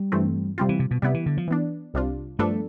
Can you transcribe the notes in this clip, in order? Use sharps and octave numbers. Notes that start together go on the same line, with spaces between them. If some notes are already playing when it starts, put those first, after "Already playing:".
Already playing: G3
G2 E3 A3 C4
C3 G3 C4 F4
E3
C3
B2
C3 G3 B3 E4
E3
D3
F3
E3 B3 D4
C2 C3 G3 D4 F4
G2 F3 A3 B3 D4 A4